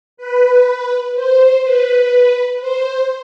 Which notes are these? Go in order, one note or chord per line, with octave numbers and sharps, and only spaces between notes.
B4
C5
B4
C5